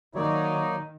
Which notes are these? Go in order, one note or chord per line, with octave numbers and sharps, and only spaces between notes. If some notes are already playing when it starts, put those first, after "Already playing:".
D#3 F#3 A#3 D#4 C#5 D5